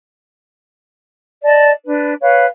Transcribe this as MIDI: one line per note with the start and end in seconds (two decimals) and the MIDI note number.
1.43 1.70 74
1.43 1.70 75
1.43 1.70 81
1.84 2.13 62
1.84 2.13 71
2.20 2.45 71
2.20 2.45 73
2.20 2.45 77